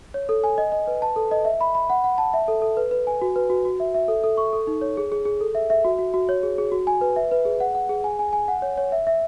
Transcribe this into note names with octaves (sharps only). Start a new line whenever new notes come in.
C#5
A4
G#5
D#5
D#5
B4
A5
A4
D#5
E5
B5
B5
F#5
F#5
A5
E5
A4
A4
B4
B4
G#5
F#4
B4
F#4
F#4
E5
E5
A4
A4
C#6
A4
D#4
C#5
G#4
G#4
G#4
A4
E5
E5
F#4
F#4
F#4
C#5
G#4
G#4
F#4
G#5
B4
E5
B4
G#4
F#5
F#5
G#4
G#5
G#5
G#5
F#5
C#5
C#5
E5
E5